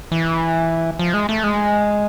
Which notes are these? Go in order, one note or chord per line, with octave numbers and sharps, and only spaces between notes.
E3
F3
G#3
A3
G#3